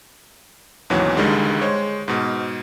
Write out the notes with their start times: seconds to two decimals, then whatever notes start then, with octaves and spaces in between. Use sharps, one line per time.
0.90 D#2 G#2 B2 E3 F#3 C#4
1.17 C#2 D3 D#3 G3 G#3
1.61 G#3 C5 C#5
2.08 G#2 B2